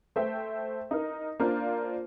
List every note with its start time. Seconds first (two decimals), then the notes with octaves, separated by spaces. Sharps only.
0.16 A3 C5 E5 G5
0.91 D#4 A#4
1.40 A#3 D4 F4 A#4 C5 D5